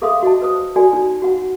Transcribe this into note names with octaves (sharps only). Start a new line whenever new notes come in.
G#4 A4 E5 F5 C6 D#6
F#4 D#5 A5
B4 C5 D#6
F#4 A4 D5 G#5
D#4
F#4 F#5